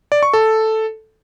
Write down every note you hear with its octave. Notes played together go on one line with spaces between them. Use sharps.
D5
C#6
A4